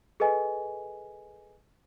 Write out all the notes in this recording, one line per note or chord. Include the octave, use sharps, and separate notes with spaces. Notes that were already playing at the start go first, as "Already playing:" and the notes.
G#4 A4 B4 D#5 G#5